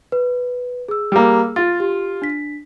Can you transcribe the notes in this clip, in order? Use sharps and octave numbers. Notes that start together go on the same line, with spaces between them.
B4
G#4 E6
G3 A#3
F4 A6
G4
D4 B6